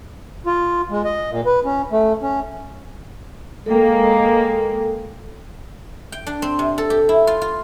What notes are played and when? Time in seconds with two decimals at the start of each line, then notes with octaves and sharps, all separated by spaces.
0.46 F4
0.90 G#3
1.05 D#5
1.30 A#2
1.46 B4
1.65 C#4
1.92 A3
2.22 C#4
3.66 G#3 A#3 A4 G5
6.12 G5
6.27 D4
6.42 C4
6.59 C3
6.78 A4
6.90 G4
7.09 E4
7.27 F4
7.42 F4